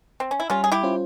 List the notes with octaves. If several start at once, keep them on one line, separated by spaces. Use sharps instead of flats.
C4
C#4
E4
G3 C#4 F4
G#4
E4 G4
C#4 F4 C5